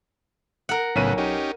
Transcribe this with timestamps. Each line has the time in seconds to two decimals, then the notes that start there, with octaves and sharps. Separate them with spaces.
0.69 A#4 F#5
0.96 B1 A2 C#3 B3 C#5 D#7
1.18 C#4 D#4 G4